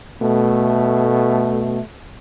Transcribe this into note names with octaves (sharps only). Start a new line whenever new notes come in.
B2 A3